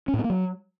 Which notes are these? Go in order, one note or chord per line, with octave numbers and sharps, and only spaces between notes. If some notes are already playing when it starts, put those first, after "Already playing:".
C#4
A2
B3
A#3
F#3